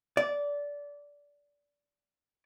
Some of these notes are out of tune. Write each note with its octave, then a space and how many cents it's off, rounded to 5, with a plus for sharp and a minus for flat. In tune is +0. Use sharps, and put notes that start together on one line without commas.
D5 -20